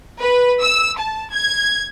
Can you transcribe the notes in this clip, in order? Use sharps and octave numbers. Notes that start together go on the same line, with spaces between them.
B4
E6
A5
G#6